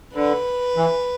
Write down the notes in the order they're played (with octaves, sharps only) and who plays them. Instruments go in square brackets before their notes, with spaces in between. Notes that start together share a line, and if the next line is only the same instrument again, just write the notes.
[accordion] D3 [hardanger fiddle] B4
[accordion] E3